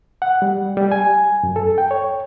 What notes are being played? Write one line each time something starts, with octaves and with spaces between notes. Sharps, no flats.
F#5
G3
G3
G#5
F#2
A4
G5
C#5